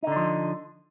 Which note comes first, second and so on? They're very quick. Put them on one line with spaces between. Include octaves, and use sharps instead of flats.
D#4 D3 D4 F3